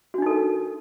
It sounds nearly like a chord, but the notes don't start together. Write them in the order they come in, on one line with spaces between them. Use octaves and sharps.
F#4 D4 D#4 A4 A#4